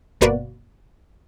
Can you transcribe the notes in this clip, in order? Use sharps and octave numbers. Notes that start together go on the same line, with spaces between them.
G1 B2 A#3 F#4 B4 D5